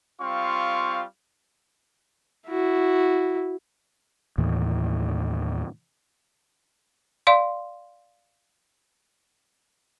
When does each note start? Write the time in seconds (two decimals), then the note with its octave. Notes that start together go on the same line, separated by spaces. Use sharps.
0.21 G3 C4 F4 F5 C#6
2.48 E4 F#4
4.38 D#2 A2 D#3 E3
7.27 D5 F5 C6